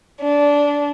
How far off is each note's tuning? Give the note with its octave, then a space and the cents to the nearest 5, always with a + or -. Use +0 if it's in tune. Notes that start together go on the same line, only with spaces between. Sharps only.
D4 -20